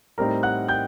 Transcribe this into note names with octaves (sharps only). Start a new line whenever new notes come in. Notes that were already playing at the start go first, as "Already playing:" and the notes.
A2 G3 C4 D#4 A#4 A#5
F#5 F#6
G5 G6